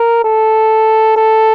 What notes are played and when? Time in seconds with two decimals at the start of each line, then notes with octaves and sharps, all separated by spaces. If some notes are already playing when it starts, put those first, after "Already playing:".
Already playing: A#4
0.24 A4
1.17 A4